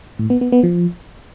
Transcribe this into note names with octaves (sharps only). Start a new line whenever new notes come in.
A2
B3
B3
B3
F3